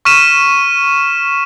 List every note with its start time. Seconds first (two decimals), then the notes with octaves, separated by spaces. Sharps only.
0.05 C#6 F6 B6 D#7 E7